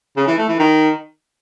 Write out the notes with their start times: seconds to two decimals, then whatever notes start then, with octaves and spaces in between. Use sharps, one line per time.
0.17 C#3
0.27 E3
0.38 A3
0.48 E3
0.59 D#3